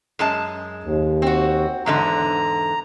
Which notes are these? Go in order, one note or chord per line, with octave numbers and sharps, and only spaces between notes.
F#2 G#3 A5
D#2
C4 F#4
E2 G#2 D3 A#5